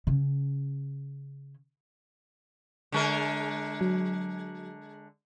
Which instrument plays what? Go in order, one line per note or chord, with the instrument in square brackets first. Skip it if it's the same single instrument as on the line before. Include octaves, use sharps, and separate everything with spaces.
[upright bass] C#3 C#4
[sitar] D3 G#3 A#4
[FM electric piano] F#3